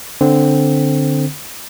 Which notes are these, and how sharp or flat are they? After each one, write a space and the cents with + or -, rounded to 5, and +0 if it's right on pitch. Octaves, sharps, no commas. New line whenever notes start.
D3 +0 C4 +0